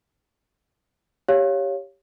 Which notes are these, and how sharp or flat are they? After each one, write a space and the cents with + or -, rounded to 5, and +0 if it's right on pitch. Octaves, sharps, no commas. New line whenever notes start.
G4 +0 C#5 +0 F5 +0